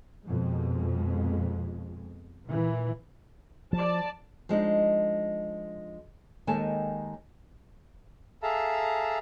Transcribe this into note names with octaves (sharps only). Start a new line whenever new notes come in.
F2 B2 G#3
A#2 E3
F3 D5 A5
F3 G#3 D4 D#4
D#2 D#3 G#3 A4 G#5 A5
G#4 A4 E5 F5 A5 A#5